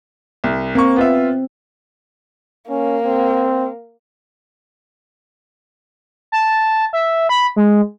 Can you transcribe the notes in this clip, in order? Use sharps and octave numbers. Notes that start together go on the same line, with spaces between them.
C2
A#3 C4 C#6
B3 F4 E5
A#3 C#4
C4
A5
E5
B5
G#3